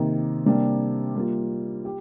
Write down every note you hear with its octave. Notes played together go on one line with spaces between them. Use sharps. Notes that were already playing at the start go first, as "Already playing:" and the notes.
Already playing: C3 D#3 A#3 D#4 G4
C3 G3 A#3 D4 G4
G3 A#3 F4
G4